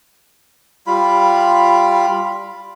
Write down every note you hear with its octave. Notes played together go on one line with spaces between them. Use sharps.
G3 F4 B5